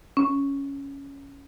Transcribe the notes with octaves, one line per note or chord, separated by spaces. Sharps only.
C#4